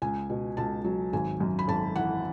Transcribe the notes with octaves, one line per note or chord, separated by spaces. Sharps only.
C#2 G#5
B2
C#2 A5
F#3
G#1 G#5
F#2
B5
G#1 A5
E3 F#5